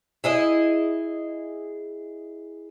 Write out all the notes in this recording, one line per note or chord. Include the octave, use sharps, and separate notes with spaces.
E4 G#4 D#5